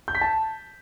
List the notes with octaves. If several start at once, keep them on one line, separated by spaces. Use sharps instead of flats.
G6
B6
A5